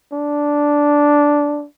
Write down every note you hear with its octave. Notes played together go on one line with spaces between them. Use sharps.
D4